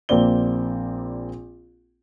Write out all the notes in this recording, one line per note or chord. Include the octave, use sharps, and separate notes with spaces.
A#1 A#3 C4 D5 G7